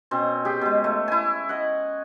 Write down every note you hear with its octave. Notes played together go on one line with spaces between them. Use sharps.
B2 C4 C#4
G4 G#4 G5
B2 G#3
A3
E4 G#5
D#5 F#5